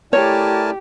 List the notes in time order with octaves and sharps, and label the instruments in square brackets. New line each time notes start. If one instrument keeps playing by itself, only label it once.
[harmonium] A3 E4 D5 [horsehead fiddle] G4 [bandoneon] A#4 G#5 A5 [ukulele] C#5